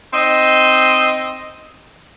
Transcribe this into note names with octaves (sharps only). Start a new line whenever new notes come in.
C4 D#4 D#5